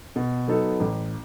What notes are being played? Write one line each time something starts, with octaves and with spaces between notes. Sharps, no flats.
B2
F#3 B3 D#4 A4
A1